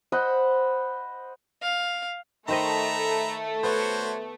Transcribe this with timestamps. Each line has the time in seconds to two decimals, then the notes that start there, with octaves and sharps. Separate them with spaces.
0.12 C5 D#5 F#5 B5
1.62 F5
2.48 D#3 A3 C5 D#5 E5 A#5 B5
3.63 B3 F#4 C5 C#5